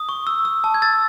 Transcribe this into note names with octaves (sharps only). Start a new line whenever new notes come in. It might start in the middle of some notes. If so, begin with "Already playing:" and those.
Already playing: D#6
C#6
E6
E6
A5
G#6
E6 A6